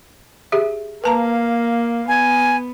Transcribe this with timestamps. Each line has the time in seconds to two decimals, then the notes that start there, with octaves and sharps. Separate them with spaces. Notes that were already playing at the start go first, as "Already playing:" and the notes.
0.52 G4 G#4 E5
1.04 A#3 B4 F5 A5 A#5
2.08 B3 G#5